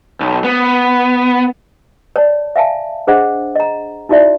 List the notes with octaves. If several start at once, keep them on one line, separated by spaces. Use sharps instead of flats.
B1
B3
C#5 D5 A5
E5 F5 G#5 A5
D4 G#4 C5 D#5 F#5
D#5 A#5
D#4 E4 F#4 D5 E5